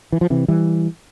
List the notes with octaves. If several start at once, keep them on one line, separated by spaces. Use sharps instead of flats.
E3
F3
C3 E3
E3 G3